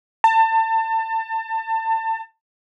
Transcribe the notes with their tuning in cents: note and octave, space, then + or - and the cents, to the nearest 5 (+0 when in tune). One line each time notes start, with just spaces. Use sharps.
A5 +30